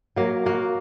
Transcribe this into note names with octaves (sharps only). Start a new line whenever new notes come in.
F#3 A#3
A#3 F#4